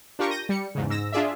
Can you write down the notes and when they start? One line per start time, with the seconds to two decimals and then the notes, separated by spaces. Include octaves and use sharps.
0.19 D4 F4 G4 A#4 C#6
0.30 G6 A#6 D#7
0.49 G3 C#7
0.75 E2 G#2 C#3
0.90 G#2 E6 A#6
1.12 D4 F4 G#4 D5 E5